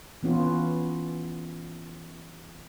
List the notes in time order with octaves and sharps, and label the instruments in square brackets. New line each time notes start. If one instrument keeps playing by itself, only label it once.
[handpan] E3 B3 C#4 F4